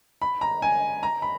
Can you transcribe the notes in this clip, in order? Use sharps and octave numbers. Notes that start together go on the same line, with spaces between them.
B5
A#5
G#5
A#5
B5